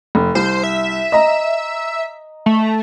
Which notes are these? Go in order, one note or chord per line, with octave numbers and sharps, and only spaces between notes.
F1
C2 C5
E5
D#5 A#5
A3